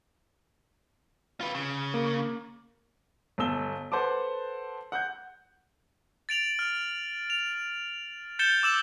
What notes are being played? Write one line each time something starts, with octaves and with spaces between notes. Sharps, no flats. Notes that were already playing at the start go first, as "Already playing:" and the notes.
F4 B4
C#3
A#3
G1 B2 A4 E6 G7
A4 B4 C5 F#5 A5 D6
F#5 F#6 G6
A6 D7 F7 F#7
F6
F7
G6 A6 C#7 E7 G7
D6 E6 E7 F#7